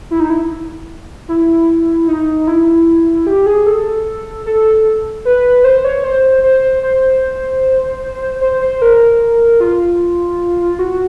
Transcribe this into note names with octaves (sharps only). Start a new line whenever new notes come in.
E4
D#4
E4
E4
D#4
E4
G4
G#4
A4
A4
B4
C5
C#5
C5
C5
C5
C5
C5
A#4
F4
F#4